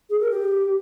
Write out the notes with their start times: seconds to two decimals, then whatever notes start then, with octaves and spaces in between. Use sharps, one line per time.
0.10 G#4
0.20 A#4
0.31 G4